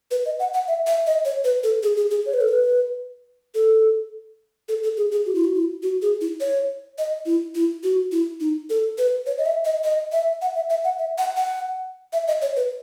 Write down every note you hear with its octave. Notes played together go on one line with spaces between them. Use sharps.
B4
D#5
F#5
F#5
E5
E5
D#5
C#5
B4
A4
G#4
G#4
G#4
C#5
B4
A4
B4
A4
A4
A4
G#4
G#4
F#4
E4
F#4
E4
F#4
G#4
E4
C#5
D#5
E4
E4
F#4
E4
D#4
A4
B4
C#5
D#5
E5
D#5
D#5
E5
F#5
E5
E5
F#5
E5
F#5
F#5
E5
D#5
C#5
B4